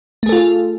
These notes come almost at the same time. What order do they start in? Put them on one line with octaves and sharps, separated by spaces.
A3 G#4 A4 F4